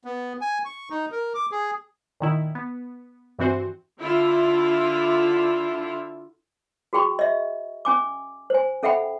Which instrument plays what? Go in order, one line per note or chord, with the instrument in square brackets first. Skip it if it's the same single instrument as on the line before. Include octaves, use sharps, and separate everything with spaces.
[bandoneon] B3
G#5
C#6
D#4
A#4
D6
G#4
[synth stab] A#2 D#3 E4
B3
G2 E3 C4 F#4 C5
[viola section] D3 E4 F4
[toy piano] F#4 G#4 G5 B5 C#6
D#5 E5
C#4 G#5 D6
C5 G#5
C#4 A4 E5 F#5 G5 B5